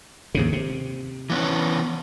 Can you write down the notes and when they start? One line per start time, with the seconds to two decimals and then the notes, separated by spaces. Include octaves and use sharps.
0.35 D#2 G#2 C#3
0.52 C3
1.30 E3 B3 C#4